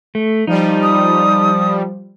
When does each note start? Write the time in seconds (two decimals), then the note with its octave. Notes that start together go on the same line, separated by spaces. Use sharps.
0.15 A3
0.47 F3 G3 D#4
0.82 D#6